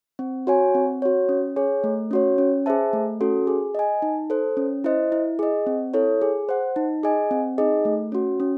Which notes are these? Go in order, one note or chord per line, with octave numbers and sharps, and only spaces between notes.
C4
F#4 C#5 G#5
C4
F#4 C#5
C#4
G#4 C#5
A3
C#4 F#4 C#5
C#4
G#4 C5 E5 A5
A3
C#4 F#4 A4
G#4
D#5 G#5
D#4
A4 C5
C#4
E4 C5 D#5
E4
G#4 D#5
C4
E4 A4 C#5
G#4
C5 F#5
D#4
G#4 D#5 G#5
C4
D#4 G#4 D#5
A3
C#4 F#4
C#4